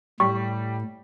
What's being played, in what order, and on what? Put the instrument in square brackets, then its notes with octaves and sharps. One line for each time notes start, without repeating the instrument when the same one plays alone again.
[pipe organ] A2 [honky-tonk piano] G3 [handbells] C#6